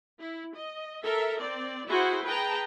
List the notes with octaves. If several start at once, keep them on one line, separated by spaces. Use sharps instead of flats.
E4
D#5
A4 A#4 E5
C4 D5
E4 F#4 G#4 C5 F#5
G#4 B4 G5 A5 A#5